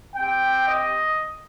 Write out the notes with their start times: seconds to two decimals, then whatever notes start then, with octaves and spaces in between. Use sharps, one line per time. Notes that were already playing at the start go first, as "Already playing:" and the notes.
0.16 C4 G4 G5
0.68 D#5